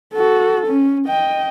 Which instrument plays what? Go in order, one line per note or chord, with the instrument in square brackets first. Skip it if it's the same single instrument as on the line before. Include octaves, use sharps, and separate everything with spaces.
[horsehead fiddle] F#4 A4
C#4
D#5 G5